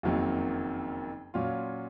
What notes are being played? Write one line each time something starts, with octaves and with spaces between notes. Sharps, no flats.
F#1 F2 D#3 F#3 A#3
A#2 F#3 C#4 F4